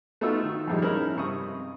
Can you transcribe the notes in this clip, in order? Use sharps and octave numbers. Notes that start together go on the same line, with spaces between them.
A3 B3 D#4 F4 F#4 E6
D#3
F2 A2 F3 G3 G#3 D#4
G#3 C#4 D#4 E4 A#4
G2 C3 C#6 D#6